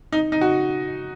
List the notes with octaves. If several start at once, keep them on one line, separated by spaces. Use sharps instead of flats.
D#4
D#4
F#4